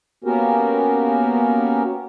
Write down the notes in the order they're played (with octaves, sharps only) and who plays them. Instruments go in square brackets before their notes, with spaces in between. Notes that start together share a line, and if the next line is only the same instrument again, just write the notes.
[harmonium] A#3 B3 C#4 F#4 G4 A#4